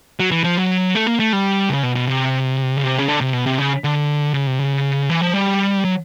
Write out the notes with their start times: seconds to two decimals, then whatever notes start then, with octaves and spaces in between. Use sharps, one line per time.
0.20 F#3
0.31 E3
0.44 F3
0.57 F#3
0.95 A3
1.07 A#3
1.19 A3
1.33 G3
1.70 C#3
1.83 B2
1.95 B2
2.07 C3
2.77 C#3
2.84 C3
2.98 C#3
3.08 D3
3.21 C3
3.33 B2
3.46 C3
3.58 C#3
3.84 D3
4.34 C#3
4.47 C3
4.59 C#3
5.10 E3
5.21 F3
5.34 G3
5.85 F#3